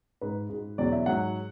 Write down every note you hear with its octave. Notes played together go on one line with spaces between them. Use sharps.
G#2 G#3 B4
G#2 G#3
E2 B2 F#3 D5
E5
G#2 F#3 F#5